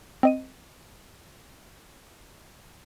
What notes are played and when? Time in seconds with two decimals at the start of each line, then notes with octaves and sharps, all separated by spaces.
0.23 C4 D#5 D#7